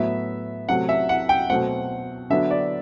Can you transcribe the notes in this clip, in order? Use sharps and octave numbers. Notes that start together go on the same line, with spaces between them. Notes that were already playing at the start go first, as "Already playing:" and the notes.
Already playing: A2 F#3 B3 E5
C3 F#3 A3 F#5
E5
F#5
G5
B2 F#3 A3 C4 F#5
D3 F#3 B3 D4 E5
D5